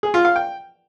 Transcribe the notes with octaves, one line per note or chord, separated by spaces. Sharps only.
G#4
F4
F5
G5